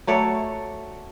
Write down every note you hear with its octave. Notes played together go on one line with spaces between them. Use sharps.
F#3 A3 C#5 D5